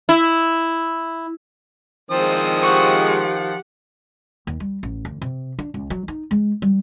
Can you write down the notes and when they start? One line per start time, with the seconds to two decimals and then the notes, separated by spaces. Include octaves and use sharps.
0.09 E4
2.11 D#3 F3 G#3 C4 D#6
2.63 G4 F#5 C#6
4.47 D#2
4.60 G3
4.83 A1
5.05 D2
5.21 C3
5.59 D4
5.74 C#2
5.90 F#3
6.08 D#4
6.31 G#3
6.62 G3